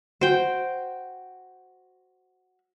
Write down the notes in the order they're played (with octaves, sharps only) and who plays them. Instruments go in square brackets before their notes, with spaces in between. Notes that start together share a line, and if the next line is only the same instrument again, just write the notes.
[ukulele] F#4 [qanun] C5 G5